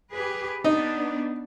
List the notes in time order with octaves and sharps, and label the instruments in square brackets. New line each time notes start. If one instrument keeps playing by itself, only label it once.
[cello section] G4 G#4 B4
[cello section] B3 D4 [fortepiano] D#4